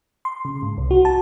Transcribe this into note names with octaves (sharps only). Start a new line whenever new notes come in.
C6
C#3
G#2
C2
F#4
A5